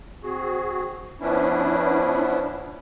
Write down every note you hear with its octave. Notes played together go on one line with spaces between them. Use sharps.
C4 F#4 G#4
F3 B3 C#4 D4 E4